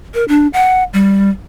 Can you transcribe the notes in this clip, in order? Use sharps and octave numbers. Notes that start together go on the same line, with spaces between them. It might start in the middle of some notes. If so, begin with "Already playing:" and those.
A#4
D4
F#5
G3